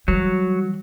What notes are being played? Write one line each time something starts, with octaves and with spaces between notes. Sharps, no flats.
E3 F#3 G3